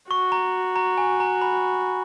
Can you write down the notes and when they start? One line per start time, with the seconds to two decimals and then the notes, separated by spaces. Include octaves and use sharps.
0.10 F#4 C#6
0.32 A#5
0.76 A#5
0.98 G#5
1.20 A#5
1.42 B5